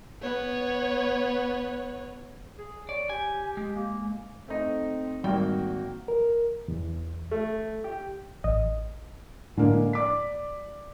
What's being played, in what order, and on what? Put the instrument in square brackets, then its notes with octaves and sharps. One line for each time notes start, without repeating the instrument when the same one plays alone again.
[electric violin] B3 C#5
[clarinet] G#4
[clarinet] C#5 [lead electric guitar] D5
[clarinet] G4 [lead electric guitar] G#5
[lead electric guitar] G#3
[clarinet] A#3
[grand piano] A3 D#4 [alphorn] C4
[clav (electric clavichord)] G#1 [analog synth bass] G3 [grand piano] A#3 G5 [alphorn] F#4
[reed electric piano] A#4
E2
[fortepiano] A3
G4
[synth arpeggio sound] A1 D#5
[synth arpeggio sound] A2 [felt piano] D3 G#3 A#3
[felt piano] D5 D6 B6